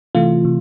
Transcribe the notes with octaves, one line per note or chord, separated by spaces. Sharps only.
C3 E3 A3 F4
C3